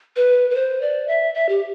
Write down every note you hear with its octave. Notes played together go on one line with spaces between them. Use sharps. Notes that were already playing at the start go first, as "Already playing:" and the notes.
B4
B4
C5
D5
E5
E5
G4